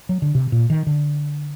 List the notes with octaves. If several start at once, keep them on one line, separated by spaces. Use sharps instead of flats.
F#3
D3
C3
A#2
D#3
D3